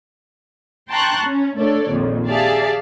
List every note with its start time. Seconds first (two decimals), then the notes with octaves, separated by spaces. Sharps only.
0.89 G5 A5 A#5 C6 C#6 F#6
1.24 C#4
1.57 A3 D4 A4 C#5 D5
1.91 A#1 F2 D#3
2.29 G4 G#4 D5 E5 F5 A5